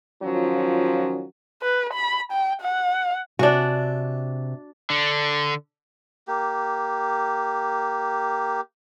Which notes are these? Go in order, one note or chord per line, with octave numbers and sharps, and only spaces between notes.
D#3 F3 F#3 C#4 F4
B4
B5
G5
F#5
C3 D4 F#4 G#5
D3
A#3 G4